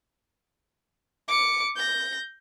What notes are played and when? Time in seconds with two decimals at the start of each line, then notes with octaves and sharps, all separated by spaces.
1.28 D6 C#7
1.76 G6 A#6